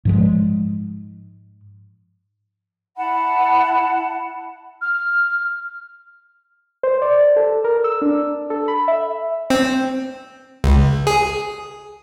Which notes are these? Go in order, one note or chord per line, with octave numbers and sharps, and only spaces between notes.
G#2 F3 G#3
E4 F#5 A5 B5
F6
C5
D5
A4
A#4
E6
D4
A4
B5
E5
C4
C#2
G#4